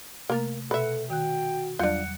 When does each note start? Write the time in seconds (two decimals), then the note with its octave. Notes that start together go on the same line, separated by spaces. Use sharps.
0.30 C3 A3 A#3 A#4
0.71 B2 A4 B4 E5 F#5
1.10 D#3 F#4 G5 F#6
1.79 E2 F#3 G3 D4 F4 F#5